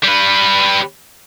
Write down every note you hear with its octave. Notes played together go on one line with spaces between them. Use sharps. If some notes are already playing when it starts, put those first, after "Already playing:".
G3 B4